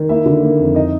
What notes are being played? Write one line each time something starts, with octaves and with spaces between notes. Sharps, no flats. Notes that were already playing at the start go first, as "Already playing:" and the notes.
Already playing: D#3
A#3 E4 E5
D3
A#3
F2
D#4 D#5